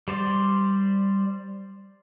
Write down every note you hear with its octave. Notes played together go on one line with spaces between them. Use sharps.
G3 C5 D5